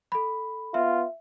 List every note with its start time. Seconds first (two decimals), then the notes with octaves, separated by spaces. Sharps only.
0.12 A4 B5
0.74 B3 F4 E5